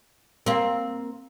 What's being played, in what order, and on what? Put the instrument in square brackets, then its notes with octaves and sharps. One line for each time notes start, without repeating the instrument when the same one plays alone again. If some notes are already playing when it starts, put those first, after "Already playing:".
[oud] A#3 C4